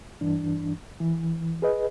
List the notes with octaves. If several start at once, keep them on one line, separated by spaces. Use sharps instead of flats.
G2 E3 D4
E3
G#4 B4 D#5